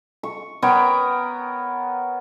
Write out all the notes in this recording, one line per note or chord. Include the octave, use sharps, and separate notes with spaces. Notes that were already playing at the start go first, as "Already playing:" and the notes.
C#6
B3 A#4 C#5 G5